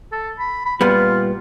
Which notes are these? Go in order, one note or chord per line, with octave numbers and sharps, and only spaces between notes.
A4
B5
B5
A#2 G3 B3 F4